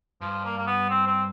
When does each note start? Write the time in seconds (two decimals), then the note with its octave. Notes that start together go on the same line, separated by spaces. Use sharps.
0.21 G2 F3
0.45 A#3
0.58 A#3
0.67 B3
0.90 C4
1.08 C4